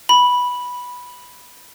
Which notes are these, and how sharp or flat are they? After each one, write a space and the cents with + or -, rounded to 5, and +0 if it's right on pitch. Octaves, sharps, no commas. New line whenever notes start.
B5 -5